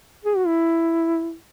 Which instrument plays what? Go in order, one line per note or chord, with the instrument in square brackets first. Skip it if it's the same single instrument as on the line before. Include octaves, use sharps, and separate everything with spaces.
[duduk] G#4
F#4
E4